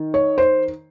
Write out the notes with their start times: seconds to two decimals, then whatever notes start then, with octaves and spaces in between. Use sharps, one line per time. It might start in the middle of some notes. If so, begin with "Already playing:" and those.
Already playing: D#3
0.14 C#5
0.38 C5